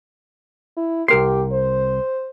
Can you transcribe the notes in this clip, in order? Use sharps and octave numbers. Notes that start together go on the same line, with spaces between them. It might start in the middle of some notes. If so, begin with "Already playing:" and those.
E4
C2 G4 A#4 C6
C5